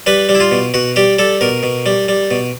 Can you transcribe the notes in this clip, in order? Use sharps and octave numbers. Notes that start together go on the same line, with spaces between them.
G3 B4
G3
E4
F4
B2
B2 F#4
G3 G4
G3 A4
B2 A#4
B2
G3
G3
B2